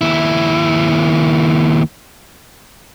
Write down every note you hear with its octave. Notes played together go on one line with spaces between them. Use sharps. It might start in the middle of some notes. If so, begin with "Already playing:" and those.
D#2 E4